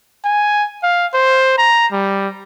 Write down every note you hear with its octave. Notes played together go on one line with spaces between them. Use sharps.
G#5
F5
C5
A#5
G3